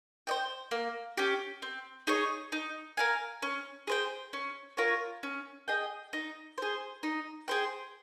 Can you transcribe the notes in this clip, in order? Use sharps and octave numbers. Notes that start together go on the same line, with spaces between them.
C5 D#5 G5
A#3
C#4 G4
C4
D#4 G#4 C#5
D#4
A#4 F5 G#5
C#4
G#4 C5 G5
C#4
F4 A#4 C#5
C#4
G#4 D#5 G5
D#4
G#4 C5
D#4
G#4 C5 G5